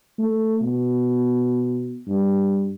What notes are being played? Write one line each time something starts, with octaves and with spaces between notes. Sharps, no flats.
A3
B2
G2